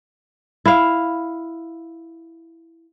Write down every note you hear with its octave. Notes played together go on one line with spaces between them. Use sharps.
E4 F5